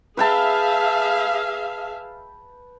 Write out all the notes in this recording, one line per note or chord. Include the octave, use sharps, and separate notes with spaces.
G#4 B4 E5 F5 G5 A5